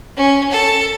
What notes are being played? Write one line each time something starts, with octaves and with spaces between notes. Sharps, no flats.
C#4
A4